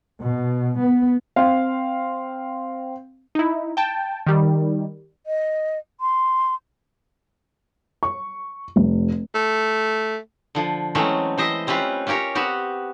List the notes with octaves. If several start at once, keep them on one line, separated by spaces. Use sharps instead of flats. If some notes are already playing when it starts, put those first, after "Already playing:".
B2
B3
C4 F5
D#4 E4
G5 A5
D#3 G3
D#5
C6
C#6
F1
A3
D3 F3
E3 F#3 G#3 A3 C4 C#4
E3 C5 D#5 E5
G3 C4 C#4 F4 B4
C#4 F4 G4 A#4 C#5
B3 C4 F#4 G4